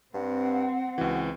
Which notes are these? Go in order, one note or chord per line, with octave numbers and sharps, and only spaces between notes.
G2 C4 F#5
C#2 E3 F#4